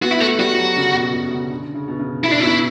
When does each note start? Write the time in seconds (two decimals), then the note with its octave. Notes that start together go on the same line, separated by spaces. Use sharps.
0.02 B3 F#4
0.11 E4
0.20 A3 F#4
0.38 G3 F#4
0.58 F#3
0.77 C#3
0.94 B2
1.13 B2
1.31 C#3
1.50 D3
1.74 C#3
1.88 B2
1.99 C#3
2.24 B2 E4
2.31 D4
2.40 B2 E4